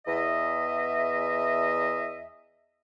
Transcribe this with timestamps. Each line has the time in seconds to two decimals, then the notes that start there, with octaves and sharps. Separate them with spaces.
0.06 E2 D#5 E5